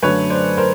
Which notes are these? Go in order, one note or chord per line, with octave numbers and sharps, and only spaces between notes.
F#2 D3 F#3 A3 B4 C#5
C5 D5
A#4 C5